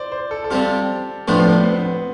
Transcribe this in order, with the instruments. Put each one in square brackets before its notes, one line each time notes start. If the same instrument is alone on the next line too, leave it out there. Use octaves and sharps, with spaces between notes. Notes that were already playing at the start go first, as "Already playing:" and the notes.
Already playing: [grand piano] C5 D5
C5
A4
A4
[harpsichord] C3 G3 C4 F4 [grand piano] G4
[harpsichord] A2 F3 A3 D4 F4 [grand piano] B3
[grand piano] C4
B3
C4
B3